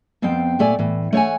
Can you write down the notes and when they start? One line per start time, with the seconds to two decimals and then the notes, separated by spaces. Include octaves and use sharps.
0.22 F2 B3 C4 F5 G5
0.59 A#2 A3 D5 G#5
0.79 A2 E3
1.13 A3 C#5 F#5 G#5